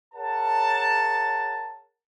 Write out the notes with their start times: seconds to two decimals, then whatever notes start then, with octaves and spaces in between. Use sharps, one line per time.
0.14 G#4 A#4 C#5 F#5 A5